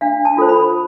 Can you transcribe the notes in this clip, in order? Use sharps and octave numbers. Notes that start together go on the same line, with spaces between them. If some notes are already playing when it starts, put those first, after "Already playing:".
D4 F5
A5
F4 A4 C5
B5